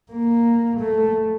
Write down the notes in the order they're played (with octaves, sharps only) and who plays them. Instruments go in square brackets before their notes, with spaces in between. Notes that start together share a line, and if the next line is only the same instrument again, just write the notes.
[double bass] A#3
A3